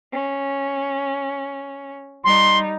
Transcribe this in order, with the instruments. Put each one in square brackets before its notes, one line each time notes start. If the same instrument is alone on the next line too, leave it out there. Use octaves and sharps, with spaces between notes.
[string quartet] C#4
[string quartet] G3 D#4 [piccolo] C6